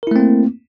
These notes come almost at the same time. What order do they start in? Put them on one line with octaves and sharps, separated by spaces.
A#4 E4 A3 C4 A#3